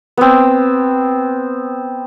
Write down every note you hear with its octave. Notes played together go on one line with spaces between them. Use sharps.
B3 C4